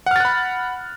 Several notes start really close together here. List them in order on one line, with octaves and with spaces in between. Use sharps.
F#5 F6 A6 F#6 B5